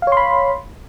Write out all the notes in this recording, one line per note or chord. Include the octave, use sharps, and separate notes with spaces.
C#5 F5 B5 C6